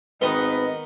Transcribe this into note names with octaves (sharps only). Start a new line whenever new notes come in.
G#1 D#3 B3 B4 D#5